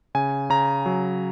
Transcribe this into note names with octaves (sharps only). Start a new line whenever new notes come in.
C#3 G#5
C#3 A#5
F#3